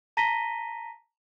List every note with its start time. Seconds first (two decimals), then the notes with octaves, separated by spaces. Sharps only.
0.17 A5 A#5 A#6 B6 D#7 G7